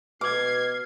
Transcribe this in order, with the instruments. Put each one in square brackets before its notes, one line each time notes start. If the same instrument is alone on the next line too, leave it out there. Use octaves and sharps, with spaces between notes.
[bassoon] B2 [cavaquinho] D6 [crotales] F6 [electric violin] G#6 C7